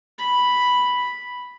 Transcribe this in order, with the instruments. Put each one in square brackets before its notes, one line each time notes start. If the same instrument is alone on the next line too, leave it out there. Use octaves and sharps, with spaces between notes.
[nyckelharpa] B5